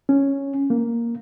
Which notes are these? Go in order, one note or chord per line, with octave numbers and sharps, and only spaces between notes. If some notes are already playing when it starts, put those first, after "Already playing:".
C#4
A#3